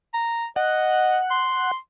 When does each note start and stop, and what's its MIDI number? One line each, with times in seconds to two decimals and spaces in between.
0.14 0.46 82
0.56 1.18 75
0.56 1.71 78
1.31 1.77 84